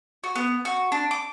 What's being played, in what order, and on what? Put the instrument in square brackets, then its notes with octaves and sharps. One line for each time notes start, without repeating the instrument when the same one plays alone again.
[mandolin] F#4
B3
F#4
D4
D6